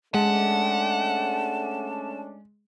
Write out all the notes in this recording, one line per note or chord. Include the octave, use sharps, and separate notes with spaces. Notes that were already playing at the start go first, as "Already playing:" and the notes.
G#3 A3 C#4 D4 F#5 A5